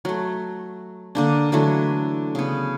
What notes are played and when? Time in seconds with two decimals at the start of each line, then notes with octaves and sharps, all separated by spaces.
0.05 F#3 A3
1.15 D3 A#3 D4
1.52 D3 E3 F#3 A3
2.35 C#3 B3